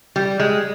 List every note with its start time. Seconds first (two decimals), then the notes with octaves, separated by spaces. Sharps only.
0.16 G3
0.40 G#3